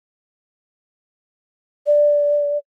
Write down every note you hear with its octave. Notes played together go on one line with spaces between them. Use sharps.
D5